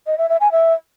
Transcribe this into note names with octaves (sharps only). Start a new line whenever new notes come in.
D#5
E5
E5
G#5
E5